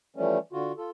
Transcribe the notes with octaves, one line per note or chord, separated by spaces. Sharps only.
E3 F3 G3 A3 C#4
D3 F4 F#4
F4 A4